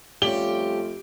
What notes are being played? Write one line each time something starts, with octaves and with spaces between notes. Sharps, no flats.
F2 G3 A3 C#4 F4 G4 G7